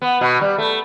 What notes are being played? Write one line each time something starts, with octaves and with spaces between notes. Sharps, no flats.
B3
B2
G3
A3